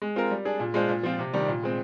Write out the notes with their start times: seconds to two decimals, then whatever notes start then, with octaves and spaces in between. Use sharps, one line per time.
0.02 G#3
0.16 C4 F4 A#4
0.31 G3
0.45 D4 G#4
0.60 A#2
0.74 G#3 D4 F4 C5
0.89 A#2
1.03 F3 C4 F4
1.19 C3
1.33 D#3 G3 D4
1.48 A#2
1.63 G#3 C4